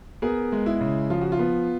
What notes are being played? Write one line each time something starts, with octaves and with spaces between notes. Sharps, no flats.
B3 G#4 A#4
G#3
E4
C#3
F3 F4
F#4
F4
B3